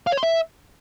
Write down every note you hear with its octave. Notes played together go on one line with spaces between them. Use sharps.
F5
C#5
C6
E5